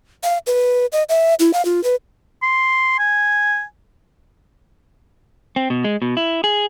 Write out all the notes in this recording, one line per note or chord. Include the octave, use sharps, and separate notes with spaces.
F5
B4
D#5
E5
E4
F5
F4
B4
C6
G#5
C4
B2
G#3
B2
E4
G#4